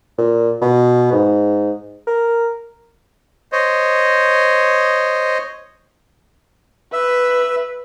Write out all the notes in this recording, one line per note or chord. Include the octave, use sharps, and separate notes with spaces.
A#2
B2
G#2
A#4
C5 C#5 D#5
B4 E5